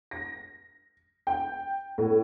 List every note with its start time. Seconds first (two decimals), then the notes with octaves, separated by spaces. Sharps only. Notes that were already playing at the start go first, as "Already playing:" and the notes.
0.11 A#6
1.27 G5
1.98 A2